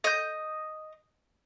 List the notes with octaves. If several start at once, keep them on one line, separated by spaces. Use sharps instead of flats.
D#5 G6